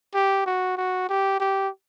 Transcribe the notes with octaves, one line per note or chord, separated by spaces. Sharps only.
G4
F#4
F#4
G4
G4